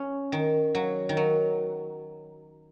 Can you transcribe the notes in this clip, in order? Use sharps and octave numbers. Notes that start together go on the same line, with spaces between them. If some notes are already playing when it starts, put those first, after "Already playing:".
Already playing: C#4
D#3
F#3
D#3
F#3